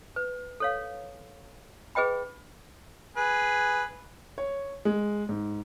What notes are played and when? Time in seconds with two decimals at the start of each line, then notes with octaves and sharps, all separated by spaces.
0.16 B4
0.60 A4 C#5 F5
1.95 G#4 B4 D#5 G5 B5
3.17 G#4 B4
4.38 C#5
4.85 G#3
5.29 G#2